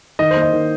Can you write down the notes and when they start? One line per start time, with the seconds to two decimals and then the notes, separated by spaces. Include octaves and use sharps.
0.19 D#3 D#5
0.31 C5
0.37 A#3
0.42 D#5
0.53 D#3